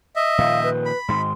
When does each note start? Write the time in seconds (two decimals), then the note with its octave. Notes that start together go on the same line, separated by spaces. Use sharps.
0.16 D#5 E5
0.38 A#2 D#3 F3 F5
0.63 B4
0.85 B5
1.08 G#2 D#3 C6